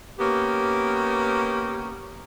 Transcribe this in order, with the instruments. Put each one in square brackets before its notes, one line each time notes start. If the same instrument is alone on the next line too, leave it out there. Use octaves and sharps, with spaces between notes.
[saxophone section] A#3 B3 C#4 G4